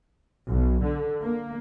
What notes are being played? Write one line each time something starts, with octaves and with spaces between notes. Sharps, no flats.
B1
D3
A#3